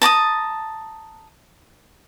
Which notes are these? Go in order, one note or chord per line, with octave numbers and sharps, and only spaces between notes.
A5 A#5 D6 D#6